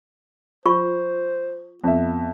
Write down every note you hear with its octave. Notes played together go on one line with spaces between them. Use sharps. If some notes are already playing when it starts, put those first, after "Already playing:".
F4 C5 C#6
F2 B3 E5